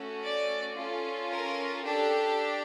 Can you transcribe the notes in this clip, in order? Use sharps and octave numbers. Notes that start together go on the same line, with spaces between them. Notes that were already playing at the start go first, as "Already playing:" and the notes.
Already playing: A3 C#4 F#4 A4
D5
C#4 F4 A4
A#4
D4 G4 A4